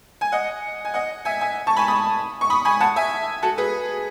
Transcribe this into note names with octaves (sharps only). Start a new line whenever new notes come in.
G#5
D#5 F#5
G#5
D#5 F#5
E5 G#5
E5 G#5
A5 C#6
G#5 B5
B5 D#6
C#6
B5 D#6
G#5 B5
F#5 A5
E5 G#5
F#4 A4
G#4 B4